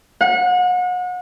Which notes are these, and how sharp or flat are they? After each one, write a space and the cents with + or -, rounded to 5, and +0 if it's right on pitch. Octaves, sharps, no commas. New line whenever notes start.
F#5 -35